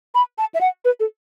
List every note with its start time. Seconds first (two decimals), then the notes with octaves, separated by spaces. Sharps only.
0.15 B5
0.38 A5
0.54 E5
0.61 F#5
0.85 B4
1.00 A4